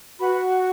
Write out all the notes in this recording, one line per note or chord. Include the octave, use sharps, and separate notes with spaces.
F#4 B4 B5